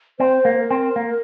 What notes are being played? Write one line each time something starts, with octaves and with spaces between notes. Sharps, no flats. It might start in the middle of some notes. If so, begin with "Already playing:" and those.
C4 C5
A#3
A#4
C4
A#3